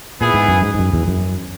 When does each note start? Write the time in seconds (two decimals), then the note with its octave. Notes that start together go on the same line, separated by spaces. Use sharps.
0.20 A#2 B3 E4 G#4
0.34 G#2
0.48 F#2
0.62 G#2
0.74 G#2
0.79 F#2
0.93 E2
1.08 F#2